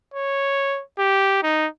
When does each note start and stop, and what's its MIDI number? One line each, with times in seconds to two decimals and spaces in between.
0.14 0.81 73
0.99 1.38 67
1.43 1.67 63